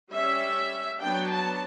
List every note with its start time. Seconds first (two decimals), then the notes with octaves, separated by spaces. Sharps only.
0.11 G3 C#4 E5
1.00 F#3 B3 D4 G5
1.31 A5